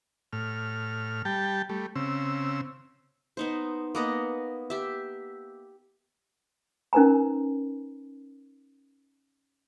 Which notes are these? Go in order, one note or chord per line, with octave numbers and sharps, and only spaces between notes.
A2 F6
G3 G5 A5
G3 A3
C#3 C4 E6
B3 D#4 C5
A#3 B3 D#5
G4 E5
C#4 D#4 A#4 B4 G#5 A#5